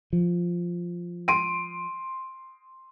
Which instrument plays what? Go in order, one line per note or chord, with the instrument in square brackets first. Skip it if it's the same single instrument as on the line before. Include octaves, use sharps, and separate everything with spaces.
[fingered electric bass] F3
[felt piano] C6 D7 D#7